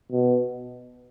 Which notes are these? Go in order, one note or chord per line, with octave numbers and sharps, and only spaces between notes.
B2